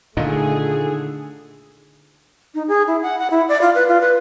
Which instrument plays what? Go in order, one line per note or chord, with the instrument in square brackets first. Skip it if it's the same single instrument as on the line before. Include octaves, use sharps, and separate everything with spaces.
[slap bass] A#2 D#3 [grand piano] D3 [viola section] A3 G#4 [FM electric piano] D#4 F4 A4
[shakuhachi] D#4
G#4
E4
F#5
F#5
E4
D5
F4
B4
F4
B4